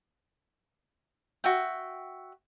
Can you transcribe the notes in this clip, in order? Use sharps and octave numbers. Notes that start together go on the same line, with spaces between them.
F#4 E5 G5